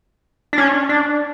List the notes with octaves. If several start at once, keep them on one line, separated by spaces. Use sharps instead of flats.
D4
C#4
D4